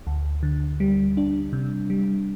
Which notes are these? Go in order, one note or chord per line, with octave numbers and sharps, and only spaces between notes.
D2
D3
G3
D4
C3
G3